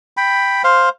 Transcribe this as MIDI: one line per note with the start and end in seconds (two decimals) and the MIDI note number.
0.17 0.62 79
0.17 0.62 83
0.64 0.89 72
0.64 0.89 77